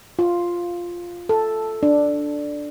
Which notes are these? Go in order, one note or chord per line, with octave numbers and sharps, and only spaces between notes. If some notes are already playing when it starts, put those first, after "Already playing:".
F4
A4
D4